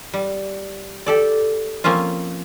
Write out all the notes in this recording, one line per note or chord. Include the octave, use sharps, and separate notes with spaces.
G3
G4 A4 D5
F3 A#3 C4 C#4 F4